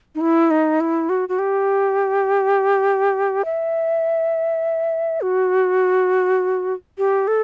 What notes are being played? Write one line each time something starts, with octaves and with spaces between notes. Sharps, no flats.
D#4
E4
D#4
E4
F#4
F#4
G4
E5
F#4
G4
A4